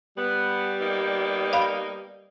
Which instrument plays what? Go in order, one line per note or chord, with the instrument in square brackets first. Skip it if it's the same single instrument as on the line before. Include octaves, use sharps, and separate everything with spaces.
[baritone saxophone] G3 [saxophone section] B3
[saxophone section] A#3 B3 D#4
[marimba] D5 F5 B5